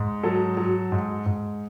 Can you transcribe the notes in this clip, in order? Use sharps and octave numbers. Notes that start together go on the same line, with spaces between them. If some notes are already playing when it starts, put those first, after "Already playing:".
Already playing: G#2
F#3 A4
F#3
G#2
G#2